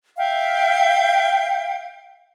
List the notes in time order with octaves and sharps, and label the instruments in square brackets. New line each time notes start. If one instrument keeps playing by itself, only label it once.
[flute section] E5 F5 G5